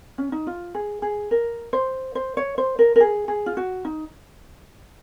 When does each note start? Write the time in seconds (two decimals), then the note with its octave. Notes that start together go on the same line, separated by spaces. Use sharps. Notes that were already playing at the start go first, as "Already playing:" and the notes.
0.18 C#4
0.32 D#4
0.47 F4
0.75 G#4
1.02 G#4
1.31 A#4
1.73 C5
2.15 C5
2.37 C#5
2.58 C5
2.79 A#4
2.96 A#4
3.00 G#4
3.28 G#4
3.46 F4
3.57 F#4
3.85 D#4